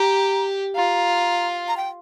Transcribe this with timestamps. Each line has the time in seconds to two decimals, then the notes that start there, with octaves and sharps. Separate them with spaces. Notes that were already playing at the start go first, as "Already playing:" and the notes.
Already playing: G4 A#5
0.75 F4 A#5
1.68 A#5
1.77 G5